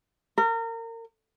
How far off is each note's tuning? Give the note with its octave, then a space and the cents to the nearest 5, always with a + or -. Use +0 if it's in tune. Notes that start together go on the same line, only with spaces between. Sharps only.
A#4 -30